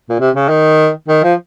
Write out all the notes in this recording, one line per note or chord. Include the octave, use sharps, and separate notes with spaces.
A#2
C3
C#3
D#3
D#3
F3